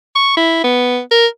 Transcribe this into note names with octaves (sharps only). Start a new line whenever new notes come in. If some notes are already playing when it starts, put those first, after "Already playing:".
C#6
E4
B3
A#4